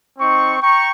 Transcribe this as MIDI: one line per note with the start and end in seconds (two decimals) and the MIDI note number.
0.19 0.56 60
0.19 0.56 63
0.19 0.56 85
0.61 0.91 79
0.61 0.91 82
0.61 0.91 85